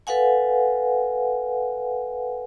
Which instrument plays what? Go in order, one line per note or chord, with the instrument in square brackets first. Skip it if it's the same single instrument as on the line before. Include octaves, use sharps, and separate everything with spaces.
[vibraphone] A4 B4 F5 F#5 G#5